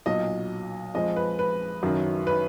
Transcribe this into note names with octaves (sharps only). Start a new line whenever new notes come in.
B1 A#2 F#3 D#5
F2 F3 G#3 D#5
B4
B4
F#1 F#2 D#3 F#3
B4